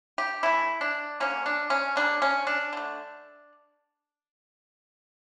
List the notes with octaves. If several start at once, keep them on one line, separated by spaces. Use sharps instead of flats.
G4
E3 A3 E4
D4
D3 F3 A#3 C#4
D4
C#4
D3 G3 A#3 D4
C#4
D4
D3 A3